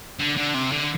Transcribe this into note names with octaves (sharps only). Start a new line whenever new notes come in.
D3
D3
C3
D3